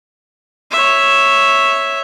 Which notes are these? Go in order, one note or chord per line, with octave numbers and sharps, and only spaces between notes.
C#5 E5